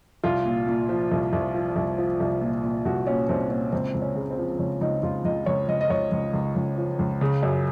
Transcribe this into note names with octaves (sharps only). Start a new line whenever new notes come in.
C2 F4
A#2
A#2
F3
C2
C2
F3
C2
F3
C2
A#2
A#2
C2 F#4
A#2 C#4
C2 C4
A#2 C#4
C#2 C4
C#2
C#4
C#3
C4
F3
C#2 C#4
C#2 D#4
C#2 F4
C#2 D#5
C#2 C#5
C#2 D#5
D#5
C#2 C#5
C#2
C#2
C#2
F3
C#2
C#3
F#2